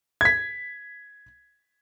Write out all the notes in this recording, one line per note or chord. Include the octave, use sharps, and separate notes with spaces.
G#6 B6